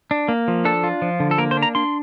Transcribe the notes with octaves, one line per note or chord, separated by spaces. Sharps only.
D4
A#3
F3
D4 A4
F4
F3
D3
A4
A#3 A#4
C5
D4
A#5
D4 C6